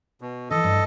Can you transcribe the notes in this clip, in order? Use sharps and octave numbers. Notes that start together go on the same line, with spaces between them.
B2
D3 E3 A4 D#5
G2